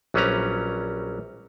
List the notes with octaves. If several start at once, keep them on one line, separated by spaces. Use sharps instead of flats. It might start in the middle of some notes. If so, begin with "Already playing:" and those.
A#1 F#3 G3 C#4 B4 A#5